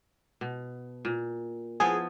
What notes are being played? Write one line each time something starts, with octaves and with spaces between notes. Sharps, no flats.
B2
A#2
F3 B3 E4 G#4